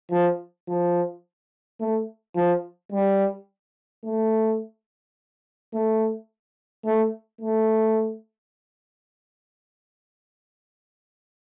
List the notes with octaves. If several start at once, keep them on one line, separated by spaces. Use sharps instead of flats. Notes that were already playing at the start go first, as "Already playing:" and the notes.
F3
F3
A3
F3
G3
A3
A3
A3
A3